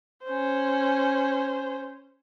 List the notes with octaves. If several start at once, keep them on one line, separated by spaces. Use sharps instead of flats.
C#4 C5